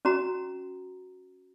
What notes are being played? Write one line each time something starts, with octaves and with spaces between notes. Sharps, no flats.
C#4 F#4 A#5